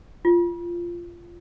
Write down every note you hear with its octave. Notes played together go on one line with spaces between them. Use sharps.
F4